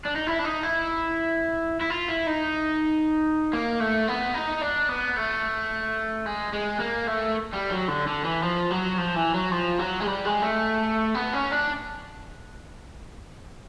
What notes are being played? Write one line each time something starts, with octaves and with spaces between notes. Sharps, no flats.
D4
D#4
E4
D4
D#4
E4
E4
F4
E4
D#4
A#3
A3
B3
D#4
D4
B3
A3
G#3
G#3
A#3
A3
G3
F#3
D3
D3
E3
F3
F#3
F3
E3
F#3
F3
F#3
G#3
G3
G#3
A3
B3
C#4
D4